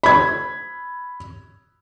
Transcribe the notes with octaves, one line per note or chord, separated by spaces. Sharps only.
B5 G#6